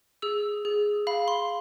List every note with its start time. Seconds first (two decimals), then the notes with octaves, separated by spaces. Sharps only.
0.22 G#4 E6
0.65 G#4
1.07 F5 B5
1.28 C6